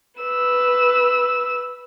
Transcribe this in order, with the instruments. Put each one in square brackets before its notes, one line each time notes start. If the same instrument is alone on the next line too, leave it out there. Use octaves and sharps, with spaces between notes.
[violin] B4 E6